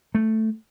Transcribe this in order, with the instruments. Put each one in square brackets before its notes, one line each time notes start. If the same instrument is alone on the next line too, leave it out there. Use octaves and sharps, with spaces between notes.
[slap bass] A3